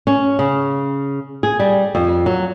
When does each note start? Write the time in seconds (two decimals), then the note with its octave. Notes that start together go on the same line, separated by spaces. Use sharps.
0.07 C#4
0.39 C#3
1.43 G#4
1.59 G3
1.95 F2
2.26 F#3